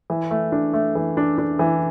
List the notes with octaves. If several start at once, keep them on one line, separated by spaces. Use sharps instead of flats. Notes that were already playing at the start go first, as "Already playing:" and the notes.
E3
A3
D4
A3
E3
D4
D4
E3